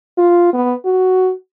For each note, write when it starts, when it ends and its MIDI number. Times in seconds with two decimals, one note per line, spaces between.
0.18 0.49 65
0.53 0.73 59
0.85 1.31 66